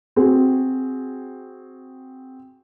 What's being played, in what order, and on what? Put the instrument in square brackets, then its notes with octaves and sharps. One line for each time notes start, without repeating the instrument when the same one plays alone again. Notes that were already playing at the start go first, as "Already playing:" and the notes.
[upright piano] C4 F#4 G#4